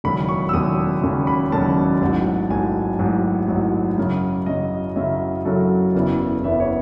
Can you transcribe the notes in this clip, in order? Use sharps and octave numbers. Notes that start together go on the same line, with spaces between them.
E1 D#2 C#3 F#3 C#4 B5
C#6
E6
E1 D#2 C#3 F#3 C#4 D#6
E1 D#2 C#3 F#3 C#4
B5
E1 D#2 C#3 F#3 C#4 A5
A1 G#2 F#3
A1 G#2 F#3 G#5
A1 G#2 F#3
A1 G#2 F#3
F#2 C#3 F#3
F#2 C#3 F#3 D#5
F#2 C#3 F#3 E5
F#2 C#3 F#3 A4
F#1 E2 C#3 E3 B3
F#1 E2 C#3 E3 B3 E5
C#5